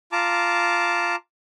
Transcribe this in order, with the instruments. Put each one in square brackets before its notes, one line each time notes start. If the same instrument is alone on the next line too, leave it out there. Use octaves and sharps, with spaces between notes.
[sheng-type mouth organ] F4 A5 A#5 D6